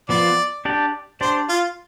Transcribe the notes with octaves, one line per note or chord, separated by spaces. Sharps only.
F3 B3 F4 D5
D4 G4 D5
D4 G4 C5 D5
F4